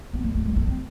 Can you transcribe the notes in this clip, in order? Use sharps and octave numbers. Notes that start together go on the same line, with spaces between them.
B3
A#3
A3
G#3
A3
C4